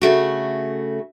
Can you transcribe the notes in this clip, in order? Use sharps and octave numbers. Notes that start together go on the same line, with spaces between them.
C#3 A3 F#4